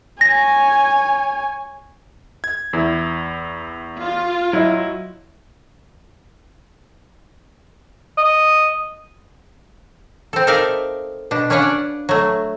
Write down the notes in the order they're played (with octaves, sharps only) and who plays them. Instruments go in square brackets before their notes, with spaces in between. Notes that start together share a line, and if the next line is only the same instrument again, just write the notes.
[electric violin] C#5 G#5 [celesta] A#6
[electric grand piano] G#6
[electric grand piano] E2 [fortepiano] E4
[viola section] F4
[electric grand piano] F#3 [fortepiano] E4 D#5
[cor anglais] D#5
[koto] C4 A4
D#4 A4 A#4 D5 E5 F5
B2 D4
C#4 D4 B4 C#5 F5 F#5
D5
F#3 A3